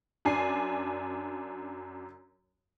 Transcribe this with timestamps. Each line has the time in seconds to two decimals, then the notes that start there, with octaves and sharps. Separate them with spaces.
0.25 F#2 D4 G#5 C7